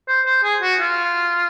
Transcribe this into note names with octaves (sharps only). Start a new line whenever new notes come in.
C5
C5
G#4
F#4
F4